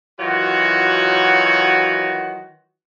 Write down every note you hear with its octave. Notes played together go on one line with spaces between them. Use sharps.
D#3 E3 F#3 F4 F#4